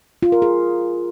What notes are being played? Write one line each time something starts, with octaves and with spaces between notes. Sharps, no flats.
F4
A#4
G#4